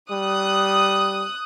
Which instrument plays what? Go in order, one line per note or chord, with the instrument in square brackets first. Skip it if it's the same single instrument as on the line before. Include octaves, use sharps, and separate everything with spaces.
[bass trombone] G3 [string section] D#6 F#6